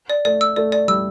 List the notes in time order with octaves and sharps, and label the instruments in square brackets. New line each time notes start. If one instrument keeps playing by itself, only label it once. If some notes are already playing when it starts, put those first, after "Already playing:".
[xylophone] D5
[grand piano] A3 [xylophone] D5
[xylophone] E6
[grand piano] A3 [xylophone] D5
[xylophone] D5
[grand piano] G3 [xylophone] E6